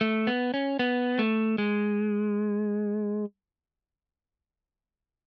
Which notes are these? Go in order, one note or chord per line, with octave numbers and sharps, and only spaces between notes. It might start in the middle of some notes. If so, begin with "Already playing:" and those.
A3
B3
C#4
B3
A3
G#3